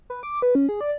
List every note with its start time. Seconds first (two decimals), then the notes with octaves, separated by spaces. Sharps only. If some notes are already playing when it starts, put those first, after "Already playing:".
0.10 B4
0.23 D6
0.42 B4
0.55 C#4
0.69 G#4
0.81 D5